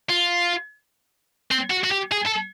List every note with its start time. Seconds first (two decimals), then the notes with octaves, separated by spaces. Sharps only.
0.10 F4
1.51 C4
1.71 F#4
1.84 F#4
1.91 G4
2.12 G#4
2.26 A4